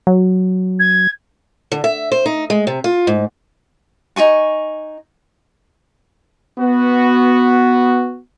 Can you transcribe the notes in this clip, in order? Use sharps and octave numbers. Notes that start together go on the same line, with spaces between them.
F#3
G#6
D3
E5
C5
D#4
G#3
C3
F4
G#2
D#4 F#4 G#5 C#6
B3 F#4